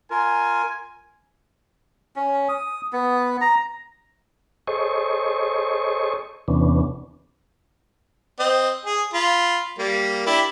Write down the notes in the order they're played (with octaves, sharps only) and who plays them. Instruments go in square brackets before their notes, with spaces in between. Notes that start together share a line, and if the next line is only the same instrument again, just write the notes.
[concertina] F4 A#4 [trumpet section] G#5
[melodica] C#4
D#6
B3
A#5
[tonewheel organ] G#4 A4 C5 C#5 D#5 C#6
E2 C3 E3 B3 C#4 D4
[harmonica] C4 D#5
G#4
F4 B5
G3 A#3
D4 E4 G4